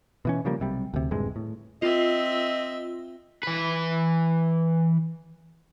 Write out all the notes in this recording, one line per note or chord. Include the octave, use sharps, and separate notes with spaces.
B2 E3 C#4
C#3 F3 G3 A#3
B1 C3 G3
D2 C3
D#1 G2 C3 G#3
A2
C4 F4 D#5 E5
E3 B4